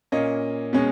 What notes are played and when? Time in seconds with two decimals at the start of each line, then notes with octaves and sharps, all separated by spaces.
0.12 A#2 A#3 C#4 D#5
0.73 B2 G#3 C#4